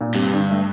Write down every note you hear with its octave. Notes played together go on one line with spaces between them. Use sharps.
A#2
G2 C3
D3
A3